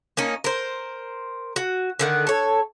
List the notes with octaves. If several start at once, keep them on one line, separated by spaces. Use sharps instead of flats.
A#3 C#4 D#4
A#4 C5
F#4
D3 D#3 F#5
A4 C#5